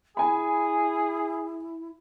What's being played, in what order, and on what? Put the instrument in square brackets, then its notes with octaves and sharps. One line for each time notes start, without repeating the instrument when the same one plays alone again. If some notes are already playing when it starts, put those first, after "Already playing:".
[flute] E4 [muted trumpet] G#4 [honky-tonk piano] G#5 B5